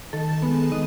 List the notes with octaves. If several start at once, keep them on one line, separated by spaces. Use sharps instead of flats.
D#3 A4
G#3 B3
D#3 D#5